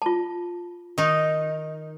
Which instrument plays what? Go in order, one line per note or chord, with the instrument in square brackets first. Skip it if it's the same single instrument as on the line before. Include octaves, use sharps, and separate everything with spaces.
[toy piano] F4 A5
[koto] D#3 D#4